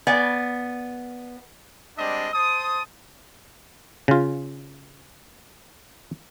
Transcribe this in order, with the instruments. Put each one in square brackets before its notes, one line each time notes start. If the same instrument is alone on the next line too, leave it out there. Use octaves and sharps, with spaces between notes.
[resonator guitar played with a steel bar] B3 D5 G#5
[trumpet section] G3 G#3 C4 D4 D#5
C5 A5 D#6
[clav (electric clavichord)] C#3 F4